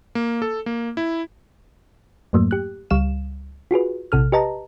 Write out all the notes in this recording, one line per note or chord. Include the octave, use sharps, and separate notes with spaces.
A#3
A4
A#3
E4
F2 G#2 F#3 A3 A#3
G4 F#6
C#2 G3 F5 E7
F4 F#4 G#4 B4
A#1 C3 A4 F6
G4 B4 D#5 A5 A#5